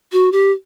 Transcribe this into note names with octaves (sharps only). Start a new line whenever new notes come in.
F#4
G4